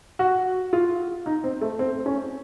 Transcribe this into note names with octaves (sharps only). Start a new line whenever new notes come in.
F#4
F4
D#4
C4
A3
C4
C#4